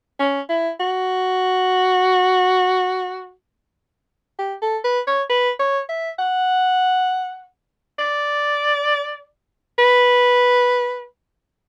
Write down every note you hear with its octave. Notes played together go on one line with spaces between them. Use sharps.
C#4
E4
F#4
G4
A4
B4
C#5
B4
C#5
E5
F#5
D5
B4